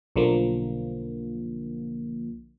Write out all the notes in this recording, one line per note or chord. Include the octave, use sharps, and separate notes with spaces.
B1 D3 F3 A#3